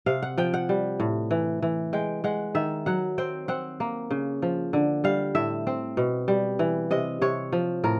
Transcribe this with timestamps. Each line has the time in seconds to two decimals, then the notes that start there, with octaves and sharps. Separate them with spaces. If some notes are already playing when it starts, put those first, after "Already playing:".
0.06 C3 F5
0.22 F#5
0.38 F3 G5
0.54 F#5
0.69 G3
1.00 A2
1.31 E3
1.62 E3
1.93 G#3 G5
2.24 G#3 F#5
2.55 D#3 E5
2.86 F#3 F#5
3.18 C4 G5
3.48 C4 F#5
3.80 A#3
4.11 C#3
4.42 F3
4.73 D3
5.04 G3 F5
5.35 A2 E5
5.67 C4
5.97 B2
6.28 G3
6.59 E3
6.91 C3 D#5
7.21 C3 C#5
7.52 F3
7.84 A2 A#4